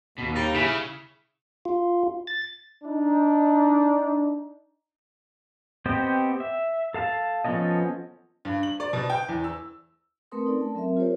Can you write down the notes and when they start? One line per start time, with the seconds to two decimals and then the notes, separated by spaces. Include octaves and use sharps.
0.18 D#2 B2
0.35 G3 D#4
0.55 C#3 E4
1.65 F4
2.27 A6
2.83 D4 D#4
5.86 B3 C4 G4 C5 D#5
6.40 E5
6.94 A4 F5 A5
7.45 F3 B3 C#4 A4 D#5
8.45 G2
8.63 F#7
8.80 D5
8.93 B2
9.10 G5
9.29 E2
9.44 E6
10.32 A3 C4 A#4 B4 C6 D#6
10.46 C#4 D#4 A4 D5
10.61 A3 A5
10.75 F#3 C4 A#4 E5
10.97 F4 G4 A#4 C5 C#5